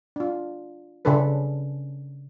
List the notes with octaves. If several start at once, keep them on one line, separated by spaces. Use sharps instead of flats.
D4 F4
C#3 C#4 D4 A4 B4